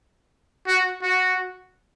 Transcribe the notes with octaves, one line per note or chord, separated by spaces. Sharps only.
F#4
F#4